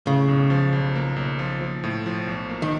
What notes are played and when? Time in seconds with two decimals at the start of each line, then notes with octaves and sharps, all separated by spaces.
0.07 A2 C#3
0.28 B1
0.50 F3
0.73 B1
0.95 A#3
1.16 B1
1.39 F3
1.61 F3
1.84 A2
2.06 F3
2.27 B1
2.50 A#3
2.62 D#3